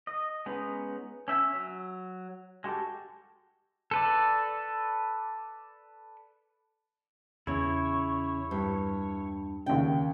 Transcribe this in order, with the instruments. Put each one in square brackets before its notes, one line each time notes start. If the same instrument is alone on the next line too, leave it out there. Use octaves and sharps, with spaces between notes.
[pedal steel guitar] D#5
G#3 B3 C#4 D#4
C#4 E5 G5 E6
F#3
G#3 F#4 G4 A4
A4 B4 D5
[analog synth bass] E2 [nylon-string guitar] C#3 [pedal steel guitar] E4 C#5
[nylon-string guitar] G2
[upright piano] D#2 C#3 [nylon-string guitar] G5